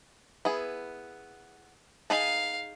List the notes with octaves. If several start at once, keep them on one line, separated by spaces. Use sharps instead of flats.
B3 E4 G#4
D#4 G#4 F5 A5